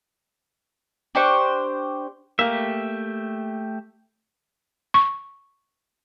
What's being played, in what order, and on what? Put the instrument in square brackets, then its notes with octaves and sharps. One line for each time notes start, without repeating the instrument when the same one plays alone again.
[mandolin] D4 G4 C5 C#6
[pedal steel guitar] A3 G4 E5 [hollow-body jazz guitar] A#3
[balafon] C#6